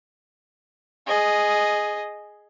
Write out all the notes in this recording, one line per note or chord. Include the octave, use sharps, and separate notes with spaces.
G#4 D#5